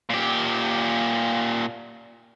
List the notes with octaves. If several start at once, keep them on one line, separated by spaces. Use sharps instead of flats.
A#2 G4